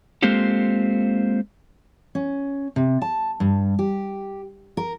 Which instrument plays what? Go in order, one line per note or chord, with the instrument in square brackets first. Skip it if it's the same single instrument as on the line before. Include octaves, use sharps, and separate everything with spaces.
[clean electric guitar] G#3 A#3 C4 F4 G4 A4
[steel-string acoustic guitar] C#4
C3
A5
G2
G4
A#4